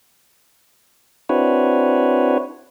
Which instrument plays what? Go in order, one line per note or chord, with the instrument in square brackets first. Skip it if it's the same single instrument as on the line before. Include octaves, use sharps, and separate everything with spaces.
[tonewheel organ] C4 D4 E4 F#4 B4 C#5